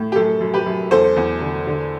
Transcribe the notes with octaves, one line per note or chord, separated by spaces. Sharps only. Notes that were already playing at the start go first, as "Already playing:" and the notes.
Already playing: A2
G4
F#2 A4
F#2
G4 B4
F#2
E2 A4 C5
E2
D3
D3